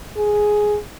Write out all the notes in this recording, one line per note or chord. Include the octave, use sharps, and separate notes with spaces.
G#4